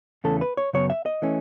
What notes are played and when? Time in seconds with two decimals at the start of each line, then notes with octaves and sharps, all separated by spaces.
0.24 E2 C#3 E3 A3 C#4 A4
0.41 B4
0.57 C#5
0.73 F#2 C#3 F#3 B3 C#5
0.90 E5
1.06 D#5
1.22 E3 A3 C#4